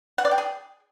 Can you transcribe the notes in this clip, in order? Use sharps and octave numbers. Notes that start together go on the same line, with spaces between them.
F#5
D5
G5
G#4